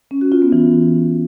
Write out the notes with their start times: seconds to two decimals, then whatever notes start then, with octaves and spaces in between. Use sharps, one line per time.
0.11 C#4
0.21 F#4
0.32 F4
0.42 B3
0.53 E3